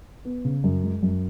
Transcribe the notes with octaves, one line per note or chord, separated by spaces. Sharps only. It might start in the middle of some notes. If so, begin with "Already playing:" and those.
B3
C#3
F#2
G#3
F#2